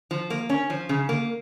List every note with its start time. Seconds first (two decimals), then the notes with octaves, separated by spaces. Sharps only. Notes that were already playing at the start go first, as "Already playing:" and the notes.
0.11 F3
0.30 A#3
0.50 C#4
0.70 F3
0.89 C#3
1.09 A#3